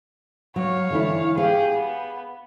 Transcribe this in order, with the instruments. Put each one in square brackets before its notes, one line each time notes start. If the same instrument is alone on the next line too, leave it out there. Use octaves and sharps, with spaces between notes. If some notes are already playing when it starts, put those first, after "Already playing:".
[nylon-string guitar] F#3 [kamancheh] C#5 F5
[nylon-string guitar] D3 E3 E4
[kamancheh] G4 G#4 [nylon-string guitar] F5
[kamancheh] B3